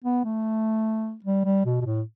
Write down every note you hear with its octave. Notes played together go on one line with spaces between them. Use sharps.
B3
A3
G3
G3
B2
B2
A2